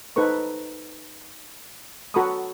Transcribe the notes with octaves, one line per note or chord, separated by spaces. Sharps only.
D#4 A4 B4 C5 C#6
F#4 A4 A#5 B5 C#6 D#6